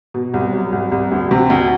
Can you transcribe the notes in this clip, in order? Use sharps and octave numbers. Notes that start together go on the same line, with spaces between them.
B2
C2
F#3
C2
C2
D2
C3
D2